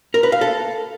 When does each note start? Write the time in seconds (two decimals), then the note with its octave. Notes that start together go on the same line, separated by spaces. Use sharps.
0.14 A#4
0.23 B4
0.32 F5
0.41 A4